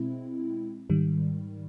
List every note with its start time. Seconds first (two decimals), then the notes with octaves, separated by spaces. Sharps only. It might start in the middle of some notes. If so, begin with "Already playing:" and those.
Already playing: B2 G#3 C4 E4
0.90 G#2 D#3 G3